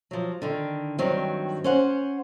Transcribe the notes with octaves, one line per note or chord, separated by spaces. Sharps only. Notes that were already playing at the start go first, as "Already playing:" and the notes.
F3 F#3
D3 D#3
G2 D#3 F#3 C4
C#4 C5 F#5